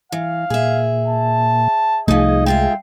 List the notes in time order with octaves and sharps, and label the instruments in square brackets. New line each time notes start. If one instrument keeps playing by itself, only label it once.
[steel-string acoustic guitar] E3 [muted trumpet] F5
[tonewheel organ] A#2 [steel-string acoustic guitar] G#4 E5
[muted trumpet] A5
[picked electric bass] C2 A3 [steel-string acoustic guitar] F3 D#4 [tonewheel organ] G#4 [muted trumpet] D#5
[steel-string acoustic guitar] G#3 F4 E5 [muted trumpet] G5